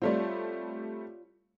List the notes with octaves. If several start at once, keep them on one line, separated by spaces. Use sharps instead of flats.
G3 A3 C4 F4 C#5 D5